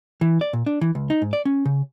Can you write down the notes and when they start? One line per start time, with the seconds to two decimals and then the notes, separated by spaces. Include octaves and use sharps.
0.21 E3
0.41 D5
0.53 A#2
0.66 D4
0.81 E3
0.95 C#2
1.10 D#4
1.22 G#2
1.33 D5
1.45 C#4
1.65 C#3